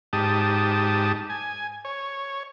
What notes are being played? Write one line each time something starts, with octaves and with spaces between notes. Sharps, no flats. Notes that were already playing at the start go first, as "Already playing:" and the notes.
G#2 G4 A5 D#6
G#5
C#5